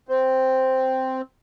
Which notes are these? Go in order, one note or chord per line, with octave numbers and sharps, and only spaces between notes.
C4